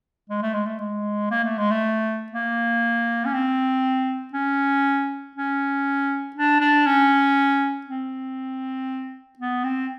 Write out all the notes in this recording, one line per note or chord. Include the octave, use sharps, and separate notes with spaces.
G#3
A3
G#3
A3
G#3
A#3
A3
G#3
A3
A#3
C#4
C4
C#4
C#4
D4
D4
C#4
C4
B3
C4